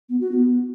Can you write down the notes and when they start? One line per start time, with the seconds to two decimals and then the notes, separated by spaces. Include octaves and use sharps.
0.09 B3
0.21 F#4
0.32 B3